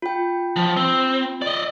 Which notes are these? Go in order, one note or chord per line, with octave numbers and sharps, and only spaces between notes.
F4 G5
F3
C4
D5 D#5